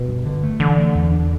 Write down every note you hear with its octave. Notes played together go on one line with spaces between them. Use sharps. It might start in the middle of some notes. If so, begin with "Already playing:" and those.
Already playing: B2
G2
D3
A3
D3 E3
A3
E2
D4